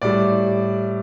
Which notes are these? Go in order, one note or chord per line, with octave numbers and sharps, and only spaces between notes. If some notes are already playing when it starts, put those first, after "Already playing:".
A2 G3 D5